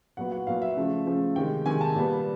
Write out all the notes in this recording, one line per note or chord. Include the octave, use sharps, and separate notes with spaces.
A#2 F#3 B3 F#5
F#5
A#2 F#3 B3 F5
E5
C#3 F3 A3
C#3 F3 A3
C3 D#3 G#3 G5
C3 D#3 G#3 G#5
A5
A#2 G3 B3